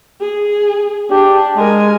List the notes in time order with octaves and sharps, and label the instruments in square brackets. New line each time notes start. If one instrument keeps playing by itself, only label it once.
[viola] G#4
[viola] D4 [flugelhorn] G4
[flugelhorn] G#3 [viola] A#4 G#5